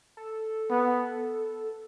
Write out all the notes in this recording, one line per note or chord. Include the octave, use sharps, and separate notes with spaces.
A4
B3